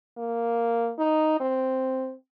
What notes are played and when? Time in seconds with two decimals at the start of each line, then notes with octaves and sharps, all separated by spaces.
0.17 A#3
0.99 D#4
1.40 C4